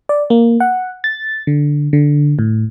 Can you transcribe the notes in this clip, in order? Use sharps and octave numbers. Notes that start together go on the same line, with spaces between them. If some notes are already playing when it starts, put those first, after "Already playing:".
D5
A#3
F#5
A6
D3
D3
A2